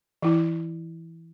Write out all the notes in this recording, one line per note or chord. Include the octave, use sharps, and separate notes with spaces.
E3 E4